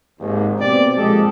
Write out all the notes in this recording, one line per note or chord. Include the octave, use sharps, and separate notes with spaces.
G#1 D#2
B2 A#3 C4 G4 D5
F2 A#2 G#3 G4 A4 D#5